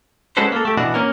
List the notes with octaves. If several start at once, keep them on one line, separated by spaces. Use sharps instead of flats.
G#3 C#4 F#4 A4 B4 C5
A#3 A4
A3 G4
B2 E3 B3 D4 F#4
A#3 C#4 A#4